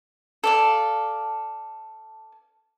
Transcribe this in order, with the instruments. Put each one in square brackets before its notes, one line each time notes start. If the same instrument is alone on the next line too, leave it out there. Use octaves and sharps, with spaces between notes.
[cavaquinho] A4 D5 F5